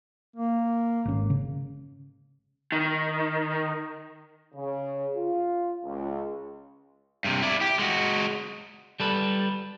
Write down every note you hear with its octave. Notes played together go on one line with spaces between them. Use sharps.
A#3
G#1 C#4
C#3
D#3
C#3
F4
C#2
G2 C3
E4 D5
G4
G#3 F#4
G3 A4 B4